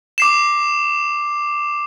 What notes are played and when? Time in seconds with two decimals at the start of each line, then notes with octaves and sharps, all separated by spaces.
0.18 D6 C7 E7